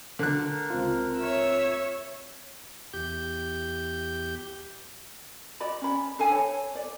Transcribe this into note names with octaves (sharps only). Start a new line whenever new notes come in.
D3 A#4 F#6
C#2 C4 F4
C#5 E5 E6
E2 G4 G6
F#4 D5 D#5 B5
C#4 B5
D4 A4 F5 G#5
C#5
D5